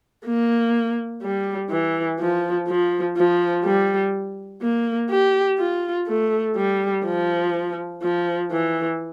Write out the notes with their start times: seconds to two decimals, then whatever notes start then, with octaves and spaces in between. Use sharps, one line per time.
0.25 A#3
1.22 G3
1.70 E3
2.20 F3
2.68 F3
3.17 F3
3.64 G3
4.62 A#3
5.10 G4
5.58 F4
6.08 A3
6.56 G3
7.05 F3
8.02 F3
8.51 E3